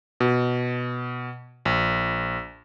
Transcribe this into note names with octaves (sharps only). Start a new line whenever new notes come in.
B2
A#1